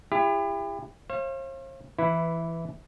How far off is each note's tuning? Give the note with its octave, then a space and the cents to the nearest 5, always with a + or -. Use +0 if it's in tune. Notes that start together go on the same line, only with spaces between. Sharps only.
E4 +25 G4 +35
C5 +45 F5 -35
E3 +10 E4 +0 B4 +0